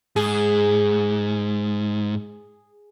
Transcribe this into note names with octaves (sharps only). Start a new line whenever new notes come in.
G#2 G#4